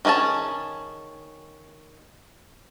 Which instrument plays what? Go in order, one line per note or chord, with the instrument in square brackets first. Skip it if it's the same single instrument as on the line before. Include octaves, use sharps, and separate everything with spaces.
[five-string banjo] D#3 C#4 E4 G#4 A5